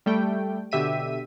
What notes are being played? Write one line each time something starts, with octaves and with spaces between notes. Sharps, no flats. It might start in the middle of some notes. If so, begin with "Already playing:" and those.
G3 A3 G5
B2 D3 G4 E5 B6 D#7